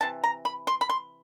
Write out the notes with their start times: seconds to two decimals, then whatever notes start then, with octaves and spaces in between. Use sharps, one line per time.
0.01 C3 E3 A5
0.24 A#5
0.45 B5
0.67 C6
0.81 B5
0.89 C6